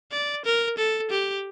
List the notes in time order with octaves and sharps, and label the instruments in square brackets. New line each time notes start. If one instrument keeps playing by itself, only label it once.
[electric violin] D5
A#4
A4
G4